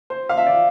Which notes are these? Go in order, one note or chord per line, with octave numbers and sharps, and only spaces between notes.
C5
F5
E5
D5